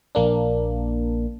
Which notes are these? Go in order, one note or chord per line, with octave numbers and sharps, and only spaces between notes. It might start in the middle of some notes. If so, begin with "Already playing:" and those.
A#1 A#3 D4